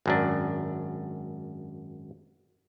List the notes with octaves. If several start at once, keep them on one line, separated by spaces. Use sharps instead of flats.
G#1 F#2 D4